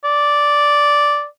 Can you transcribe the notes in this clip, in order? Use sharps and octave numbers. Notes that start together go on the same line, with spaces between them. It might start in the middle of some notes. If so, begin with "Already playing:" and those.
D5